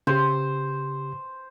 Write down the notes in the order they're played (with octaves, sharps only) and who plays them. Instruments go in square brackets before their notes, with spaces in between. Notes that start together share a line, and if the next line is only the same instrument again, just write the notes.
[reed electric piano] C#3 G4 [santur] C5